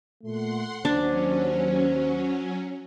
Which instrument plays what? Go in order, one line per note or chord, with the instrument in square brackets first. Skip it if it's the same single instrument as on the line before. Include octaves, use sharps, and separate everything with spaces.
[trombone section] A#2 A3 [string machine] F#5 C6
[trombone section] D#2 C5 [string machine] F#3 C#4 [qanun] D4